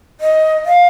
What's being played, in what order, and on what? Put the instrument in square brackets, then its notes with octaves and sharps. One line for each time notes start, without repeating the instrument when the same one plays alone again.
[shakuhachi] D#5
F5